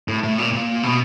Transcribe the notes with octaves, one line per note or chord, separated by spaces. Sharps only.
A2
A2
A#2
A#2
B2